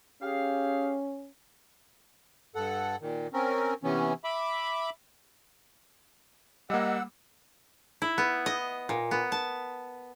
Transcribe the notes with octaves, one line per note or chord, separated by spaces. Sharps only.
C#4 G4 G#4 F5
G2 A4 F#5
A#2 D#3
C4 C#4 A#4
C3 E3 B3 C#4
E5 B5 D6
G3 A#3 D#5 F#5 E6
E4
B3
D#5
A#2
B3
A5